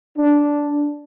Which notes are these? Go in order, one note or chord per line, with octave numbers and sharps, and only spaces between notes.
D4